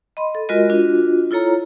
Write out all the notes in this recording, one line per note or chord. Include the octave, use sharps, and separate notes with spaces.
D#5 B5 C6
A4
G#3 F4 F#4 A#4 D#5
D4 F4 F#4
E4 F4 A4 C#5 A#5